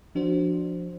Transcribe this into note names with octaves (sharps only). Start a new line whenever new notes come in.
F3 D4 F#4 C5